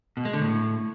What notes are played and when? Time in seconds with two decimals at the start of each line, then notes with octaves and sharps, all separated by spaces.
0.17 B2
0.25 G#3
0.33 D3
0.42 A2